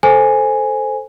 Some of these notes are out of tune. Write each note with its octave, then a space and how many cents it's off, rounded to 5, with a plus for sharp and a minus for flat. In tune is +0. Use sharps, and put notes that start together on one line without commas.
A4 +0 C5 +0 G#5 +0